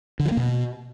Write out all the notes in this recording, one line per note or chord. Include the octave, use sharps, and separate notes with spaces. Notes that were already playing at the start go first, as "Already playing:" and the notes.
D3
F3
A#3
B2